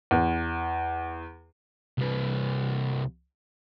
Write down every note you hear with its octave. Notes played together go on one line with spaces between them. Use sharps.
E2
C2 B4